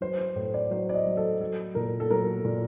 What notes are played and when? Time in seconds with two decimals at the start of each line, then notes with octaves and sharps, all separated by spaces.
0.01 F#3 C5
0.19 C5
0.36 A2 C5
0.54 D5
0.70 F#3 C5
0.89 D5
0.94 D#5
1.06 F#3
1.17 A4
1.40 F#3 A4
1.75 A#2 A#4
2.00 A4
2.10 F#3 A#4
2.45 A#2